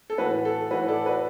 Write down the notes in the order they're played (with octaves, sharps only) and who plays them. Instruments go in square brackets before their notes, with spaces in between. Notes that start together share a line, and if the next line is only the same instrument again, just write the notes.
[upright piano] A4
A2 E3 F#4 B4
A4
A2 E3 F#4 B4
A4 D5
F#4 B4